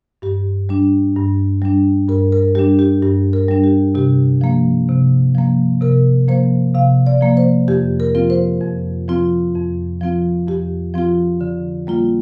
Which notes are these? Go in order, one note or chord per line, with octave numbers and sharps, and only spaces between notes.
G2 G4
G3 D4
G2
G3 D4
G2 A#4
A#4
G3 D4 G4
G4
G2 G4
A#4
G3 D4
G4
C3 G4
F3 A#3
C3
F3 A#3
C3 A#4
F3 A#3 C5
C3 F5
D5
F3 A#3
C5
F2 G4
A#4
F3 C4 F4
C5
F2
F3 C4 F4
F2
F3 C4 F4
F2 G4
F3 C4 F4
D3
G3 A#3 F4